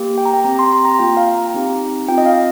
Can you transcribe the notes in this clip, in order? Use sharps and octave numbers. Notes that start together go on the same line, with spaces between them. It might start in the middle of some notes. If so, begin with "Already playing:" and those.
Already playing: A#3 G4
G5
A#5
G5
C4 G4 A#5
C6
C6
A#5
A#3 F4 G5
F5
A#5
C4 D#4 G4
C4 F4 G5
D#5
F5